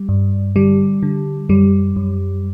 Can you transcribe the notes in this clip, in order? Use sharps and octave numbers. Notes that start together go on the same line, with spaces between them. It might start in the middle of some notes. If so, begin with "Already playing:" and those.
Already playing: G3
G2
D3 G3
D3
F#2 G3
F#2